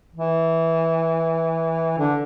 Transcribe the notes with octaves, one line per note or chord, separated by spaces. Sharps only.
E3
D3